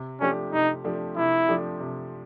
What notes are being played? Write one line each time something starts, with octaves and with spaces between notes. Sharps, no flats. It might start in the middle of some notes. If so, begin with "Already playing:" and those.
Already playing: C3
F3 A3 C#4 D4 G4
C3 D#4
F3 A3 D4 G4
C3 E4
F3 A3 D4 G4
C3